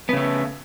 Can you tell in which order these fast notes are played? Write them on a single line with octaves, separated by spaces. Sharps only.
B3 C#3 A3